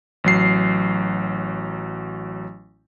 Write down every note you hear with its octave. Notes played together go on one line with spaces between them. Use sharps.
A1 F#3 C7